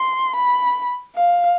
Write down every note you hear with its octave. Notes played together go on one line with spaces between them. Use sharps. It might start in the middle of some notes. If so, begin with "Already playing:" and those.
Already playing: C6
B5
F5